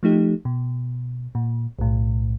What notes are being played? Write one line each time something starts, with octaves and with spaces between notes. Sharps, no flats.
F3 A3 D#4 G4
B2
A#2
B1 A2